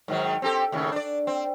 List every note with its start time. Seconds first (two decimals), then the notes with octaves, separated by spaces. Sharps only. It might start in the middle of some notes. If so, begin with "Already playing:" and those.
0.08 G#2 D#3 F#3
0.42 C4 G4 A4
0.72 D#2 A2 C#3
0.92 D4 D5
1.27 C4